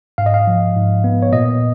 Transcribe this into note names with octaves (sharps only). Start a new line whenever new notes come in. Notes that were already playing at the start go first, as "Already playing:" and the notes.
G#2 F5
D#5
F5
F3
G#2
B3
C#5
A#2 D#5